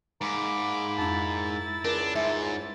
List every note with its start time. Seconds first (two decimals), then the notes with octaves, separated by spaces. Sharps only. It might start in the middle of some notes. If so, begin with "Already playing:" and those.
0.21 G#2 A#3 A#5 B5 D6
0.98 F2 D4 E4 A6
1.85 C#2 D4 A#4
2.16 G#2 E5